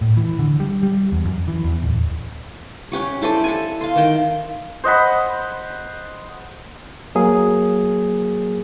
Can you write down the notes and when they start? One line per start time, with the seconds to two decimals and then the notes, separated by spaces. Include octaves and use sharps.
0.01 A2
0.17 E3
0.39 D3
0.60 G3
0.83 G3
1.12 E2
1.25 F#2
1.48 E3
1.64 E2
1.82 D1
2.92 C#4 G4 C#5
3.22 E4 A4 C5 D5
3.44 A4 G#5
3.81 F5 C6
3.96 D#3 G5
4.84 C5 D#5 F#5 B5
7.15 F#3 A#3 G#4